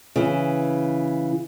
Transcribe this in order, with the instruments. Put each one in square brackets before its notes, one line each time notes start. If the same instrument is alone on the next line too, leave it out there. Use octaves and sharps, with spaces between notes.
[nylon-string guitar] C#3 E3